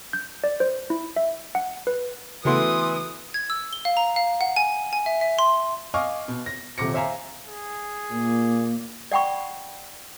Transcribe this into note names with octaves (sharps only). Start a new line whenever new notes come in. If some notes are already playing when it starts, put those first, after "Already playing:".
G6
D5
C5
E4
E5
F#5
B4
C#3 E3 A3 B3 F#4 A4 C6 D#6
G#6
E6
G7
F5
A#5
F5
F#5
G#5
G#5
E5
E5
C6
D#5 F5 G#5 C#6 D6 F6
B2
A#6
D#1 C3 D6 A#6 C#7
C5 E5 F5 G#5 A#5
G#4
A#2 A#3
D5 F#5 G5 B5 C#6